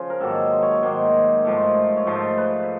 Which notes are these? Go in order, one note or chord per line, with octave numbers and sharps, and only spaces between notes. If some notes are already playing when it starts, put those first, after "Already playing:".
Already playing: C#3 F3
A#4
G#2 D#3 F#3 A#3 A4
C5
C#5
G#2 D#3 F#3 A#3 C5
G#2 F3 A3
C#5
G#2 F3 A3 C5
B4